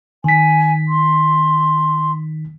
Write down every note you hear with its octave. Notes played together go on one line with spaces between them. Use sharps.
D#3 G#5 B6
C6